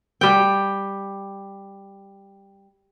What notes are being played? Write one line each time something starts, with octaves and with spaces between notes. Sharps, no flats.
G3 G5